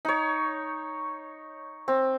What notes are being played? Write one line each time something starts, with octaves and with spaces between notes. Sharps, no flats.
D#4 C#5
C4